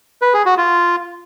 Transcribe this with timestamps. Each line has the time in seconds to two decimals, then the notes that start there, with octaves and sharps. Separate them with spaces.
0.22 B4
0.34 G#4
0.46 F#4
0.57 F4